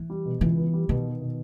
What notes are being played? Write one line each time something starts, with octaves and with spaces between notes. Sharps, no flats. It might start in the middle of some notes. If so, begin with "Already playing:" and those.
Already playing: E3
G3
B2
C#2 E3
B3
G3
B2 D#3
B3
B2